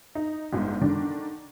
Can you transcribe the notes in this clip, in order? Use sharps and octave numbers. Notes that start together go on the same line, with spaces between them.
D#4
G1 G#2
D3 D#3 D4